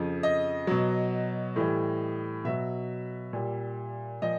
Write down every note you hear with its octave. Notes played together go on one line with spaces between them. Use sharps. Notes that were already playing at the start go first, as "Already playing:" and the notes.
Already playing: F2 C#3 F3
D#5
B2 F#3
A2 E3 G3
B2 F#3 E5
A#2 G3
A#2 F3 D#5